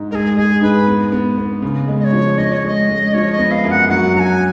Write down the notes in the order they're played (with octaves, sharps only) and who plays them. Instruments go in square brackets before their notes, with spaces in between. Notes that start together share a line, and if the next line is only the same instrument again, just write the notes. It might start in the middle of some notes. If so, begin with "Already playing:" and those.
Already playing: [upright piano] G#2
[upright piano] G#3 [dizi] G#4 A#4
[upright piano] G#3 [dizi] G#4
[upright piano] G#2 [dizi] B4
[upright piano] B3
B3
B3
C#3
G#3
[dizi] D#5
C#5
[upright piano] F3
[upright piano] C#4 [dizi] D#5
[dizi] C#5
[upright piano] G#3 [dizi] D#5
[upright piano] G#3
[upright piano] F3 [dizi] C#5
[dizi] D#5
[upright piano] B3
[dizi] F5
[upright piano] F#2
[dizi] F#5
[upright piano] F#3 [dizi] F#5
[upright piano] F#3 [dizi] A#5
[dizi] G#5